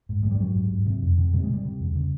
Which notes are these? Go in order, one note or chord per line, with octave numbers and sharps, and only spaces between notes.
G#2
G#2 G#3
G3
G#2 F#3
G#2
G#2
C3
F2
C3
C3 G3
G#3
C3 G3
C3
E2
C#3